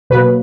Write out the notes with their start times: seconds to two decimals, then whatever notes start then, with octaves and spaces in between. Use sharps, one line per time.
0.10 B2 F#3 A#3 B4